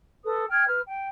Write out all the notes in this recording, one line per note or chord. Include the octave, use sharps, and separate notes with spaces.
A4 B4 D#6
G5 F6 G#6
B4 F6
G5